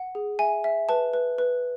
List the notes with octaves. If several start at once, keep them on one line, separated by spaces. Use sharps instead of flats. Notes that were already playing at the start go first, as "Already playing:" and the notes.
Already playing: F#5
G#4
E5 G#5
E5
B4 A5
B4
B4